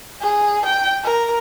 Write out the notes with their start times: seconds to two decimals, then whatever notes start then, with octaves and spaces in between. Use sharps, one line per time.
0.22 G#4
0.66 G5
1.04 A#4